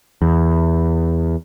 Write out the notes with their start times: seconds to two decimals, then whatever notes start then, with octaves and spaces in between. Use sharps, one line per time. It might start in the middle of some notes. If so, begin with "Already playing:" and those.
0.22 E2